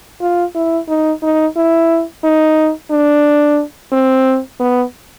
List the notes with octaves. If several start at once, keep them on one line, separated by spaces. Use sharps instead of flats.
F4
E4
D#4
D#4
E4
D#4
D4
C4
B3